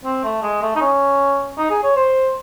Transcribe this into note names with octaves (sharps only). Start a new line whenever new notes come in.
C4
A3
G#3
A3
D#4
C#4
D#4
G#4
C#5
C5